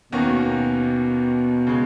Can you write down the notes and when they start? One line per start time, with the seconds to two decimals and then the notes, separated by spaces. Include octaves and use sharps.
0.12 D#2 B2 D#3 A#3 C#4 F#4
1.67 C#3 G#3